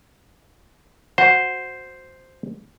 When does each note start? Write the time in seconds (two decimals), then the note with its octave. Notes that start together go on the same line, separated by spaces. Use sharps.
1.18 F#4 C5